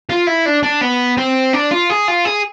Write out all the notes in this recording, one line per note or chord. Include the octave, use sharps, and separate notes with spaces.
F4
E4
D4
D4
B3
C4
D4
F4
G#4
F4
G#4